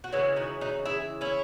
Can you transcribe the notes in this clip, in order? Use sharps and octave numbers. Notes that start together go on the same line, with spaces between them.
F#4
C#3 E3 G#3 C#4 E4
D#4 F#4
D#4 F#4
E4 G#4
C#4 E4